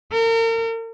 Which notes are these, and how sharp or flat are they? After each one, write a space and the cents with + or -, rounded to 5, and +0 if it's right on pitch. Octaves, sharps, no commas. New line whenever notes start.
A#4 -40